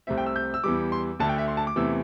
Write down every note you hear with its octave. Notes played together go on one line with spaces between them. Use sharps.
C2 C3 A3 C4 E5
G5
E6
G6
E6
E2 E3 G3 D6
C6
D2 D3 A3 A5
G5
E5
C6
A5
D6
E2 C3 E3 A3 E6